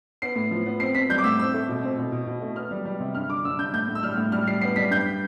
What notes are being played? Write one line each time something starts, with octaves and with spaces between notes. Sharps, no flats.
B3 C7
A2
F3
B3
C4 C7
C4 B6
G3 G6
D6
A2 E6
C4 E6
A3
B2
C4
B2
B2
B2
A3
B3 F6
G3
G3
C3
G2 F6
D3 D6
G2 E6
G2 G6
A2 G6
A2
E6
G3 F6
A2
G3 F6
G3 C7
B3 C7
G3 B6
G2 G6